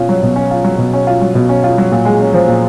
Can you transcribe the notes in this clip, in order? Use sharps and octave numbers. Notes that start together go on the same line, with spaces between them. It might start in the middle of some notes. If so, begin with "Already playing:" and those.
Already playing: B2 C#4 F4
F#3
B2
C#4
F4
F#3
B2
C#4
F4
F#3
B2
C#4
F4
F#3
A#2
G#3
C#4
F3
A#2